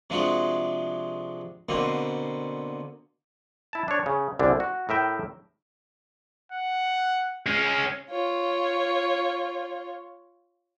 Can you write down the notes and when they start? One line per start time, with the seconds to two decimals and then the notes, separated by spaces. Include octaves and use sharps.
0.10 C3 F3 G#3 D4 F#4
1.69 B2 D3 A#3 C4
3.73 E4 A5
3.88 D4 C#5
4.06 C#3
4.39 C2 F#2 D3 D4
4.60 F#4
4.89 A2 A#4 E5 G5
6.52 F#5
7.46 G#3 C#4 F6
8.10 F4 C#5